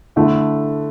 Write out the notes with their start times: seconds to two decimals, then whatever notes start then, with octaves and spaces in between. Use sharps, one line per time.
0.16 D3 A3 E4